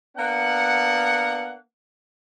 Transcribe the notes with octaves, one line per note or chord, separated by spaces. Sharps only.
A#3 B3 D4 F#5